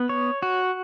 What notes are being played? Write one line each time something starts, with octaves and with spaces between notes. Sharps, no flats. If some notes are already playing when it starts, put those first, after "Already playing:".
Already playing: B3
C#5
F#4